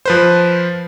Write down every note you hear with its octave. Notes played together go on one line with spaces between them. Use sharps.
F3 B4 C5